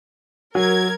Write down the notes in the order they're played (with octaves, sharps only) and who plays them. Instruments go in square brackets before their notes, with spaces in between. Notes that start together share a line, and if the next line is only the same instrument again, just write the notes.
[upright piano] F#3 [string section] A#4 G#6